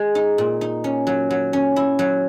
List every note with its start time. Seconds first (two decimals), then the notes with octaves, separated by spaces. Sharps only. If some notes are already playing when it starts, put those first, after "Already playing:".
Already playing: G#3
0.15 D#4
0.38 A#2
0.61 D#4
0.84 C#4
1.07 F#3
1.30 F#3
1.53 C#4
1.76 E4
1.99 F#3